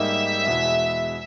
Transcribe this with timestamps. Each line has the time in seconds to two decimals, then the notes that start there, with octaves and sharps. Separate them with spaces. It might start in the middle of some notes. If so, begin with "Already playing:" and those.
Already playing: G#2 G3 A#3 D#4 E5
0.46 E2 B2 G#3 B3 E4